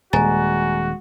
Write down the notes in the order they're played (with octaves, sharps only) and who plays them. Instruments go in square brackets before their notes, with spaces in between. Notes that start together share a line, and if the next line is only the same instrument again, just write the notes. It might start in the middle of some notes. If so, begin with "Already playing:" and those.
[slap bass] D#1 [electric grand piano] G#3 [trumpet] F#4 [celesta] G#5 A#5 A6